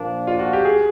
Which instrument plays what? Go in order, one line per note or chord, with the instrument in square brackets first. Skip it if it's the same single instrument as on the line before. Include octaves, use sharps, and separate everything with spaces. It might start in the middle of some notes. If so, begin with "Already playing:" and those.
Already playing: [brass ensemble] A#2 F3 A#3 D4
[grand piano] F4
F#4
G4
G#4